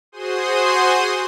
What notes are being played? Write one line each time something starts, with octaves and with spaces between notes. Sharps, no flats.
F#4 G#4 C5 C6 D#6